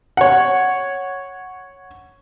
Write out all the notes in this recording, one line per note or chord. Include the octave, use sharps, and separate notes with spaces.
C#5 F#5